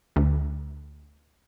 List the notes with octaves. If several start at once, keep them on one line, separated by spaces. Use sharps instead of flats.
D2